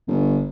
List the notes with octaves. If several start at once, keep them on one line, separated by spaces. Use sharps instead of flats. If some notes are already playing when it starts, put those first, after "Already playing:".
G1